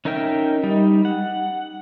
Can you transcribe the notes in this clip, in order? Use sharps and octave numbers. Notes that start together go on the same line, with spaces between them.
C#4 D#4 A#4 E5 G5
G3 D#4
F#5